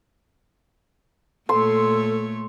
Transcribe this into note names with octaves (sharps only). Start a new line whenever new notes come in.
A#2 A3 A4 C#5 C6